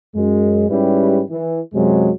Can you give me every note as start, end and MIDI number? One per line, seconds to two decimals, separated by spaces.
0.15 0.66 42
0.15 0.66 56
0.70 1.22 44
0.70 1.22 55
0.70 1.22 61
0.70 1.22 64
0.70 1.22 67
0.70 1.22 71
1.30 1.61 52
1.74 2.10 42
1.74 2.10 48
1.74 2.10 54
1.74 2.10 56